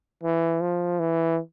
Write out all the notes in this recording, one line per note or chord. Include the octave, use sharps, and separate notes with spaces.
E3
F3
E3